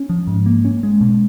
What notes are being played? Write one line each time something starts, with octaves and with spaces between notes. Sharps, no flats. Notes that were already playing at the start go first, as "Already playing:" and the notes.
Already playing: C#4
F3
G#2
A#3
C#4
G#3
B2